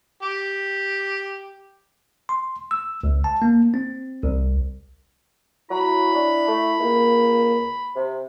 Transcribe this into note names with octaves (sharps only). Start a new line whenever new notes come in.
G4
C6
E6
C#2
A5
A#3
C4
C2
F#3 E4 B5
D4
A3
C#2 A#3
C3 C5